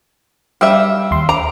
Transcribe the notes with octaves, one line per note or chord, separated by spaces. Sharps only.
G3 E5 F5 E6
D#2 C6
A#5 D6